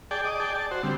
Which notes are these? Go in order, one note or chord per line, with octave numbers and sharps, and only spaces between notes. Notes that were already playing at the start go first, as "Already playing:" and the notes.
G#4 D5 G5 A5
D#5 D6
G#4 D5 G5 A5
A5
F#4 C5
D3 G3 C4